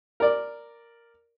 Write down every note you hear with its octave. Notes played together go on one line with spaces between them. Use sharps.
A#4 D5